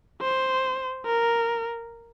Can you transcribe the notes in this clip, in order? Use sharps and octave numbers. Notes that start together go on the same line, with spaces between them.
C5
A#4